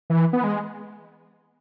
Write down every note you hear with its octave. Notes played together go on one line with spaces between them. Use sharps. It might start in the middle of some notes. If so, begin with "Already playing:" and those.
E3
B3
G#3